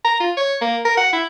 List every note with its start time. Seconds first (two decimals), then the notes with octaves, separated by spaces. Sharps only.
0.05 A#5
0.20 F4
0.37 C#5
0.61 A#3
0.85 A#4
0.97 F#5
1.13 E4